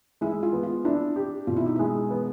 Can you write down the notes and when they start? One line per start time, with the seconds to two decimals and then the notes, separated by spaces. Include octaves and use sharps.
0.21 G#3 E4
0.43 F4
0.53 B3
0.63 F4
0.85 D4 E4
1.16 G4
1.47 B2 F4
1.57 E4
1.66 D#4
1.76 G#3 E4
2.11 B3